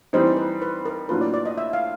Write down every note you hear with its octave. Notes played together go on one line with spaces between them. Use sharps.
E3 G3 C4 D#4 C5
B4
B4
A#4
A2 F#3 A#3 D4 F4 B4
D5
D5
D#5
E5
F5